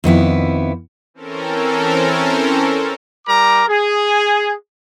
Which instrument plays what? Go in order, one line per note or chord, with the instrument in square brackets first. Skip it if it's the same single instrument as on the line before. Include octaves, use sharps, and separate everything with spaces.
[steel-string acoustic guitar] F2 D#3 B3 E4
[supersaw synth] E3 C4 C#4 A4 A#4
[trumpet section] G3 A#4 A#5 D6
G#4